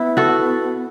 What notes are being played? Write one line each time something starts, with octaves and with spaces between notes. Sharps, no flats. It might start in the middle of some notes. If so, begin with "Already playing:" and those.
Already playing: B3 E4
F#4 A4